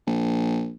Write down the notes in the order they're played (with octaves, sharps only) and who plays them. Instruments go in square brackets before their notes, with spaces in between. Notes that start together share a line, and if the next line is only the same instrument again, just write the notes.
[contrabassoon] A#1